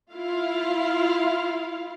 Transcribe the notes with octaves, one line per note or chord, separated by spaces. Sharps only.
E4 F4 F5